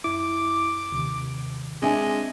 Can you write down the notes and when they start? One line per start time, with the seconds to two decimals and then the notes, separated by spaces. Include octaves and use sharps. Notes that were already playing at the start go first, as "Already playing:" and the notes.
0.04 F#2 E4 D6
0.92 D#2 C3 D#3
1.82 G#3 C4 D4 D#5 E5 G#5